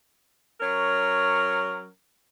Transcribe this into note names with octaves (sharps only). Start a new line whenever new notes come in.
F#3 C#4 A#4